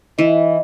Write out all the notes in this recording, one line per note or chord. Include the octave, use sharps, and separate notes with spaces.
E3 D#5